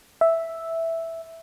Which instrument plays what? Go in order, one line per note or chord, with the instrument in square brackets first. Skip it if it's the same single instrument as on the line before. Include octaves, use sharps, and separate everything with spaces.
[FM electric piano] E5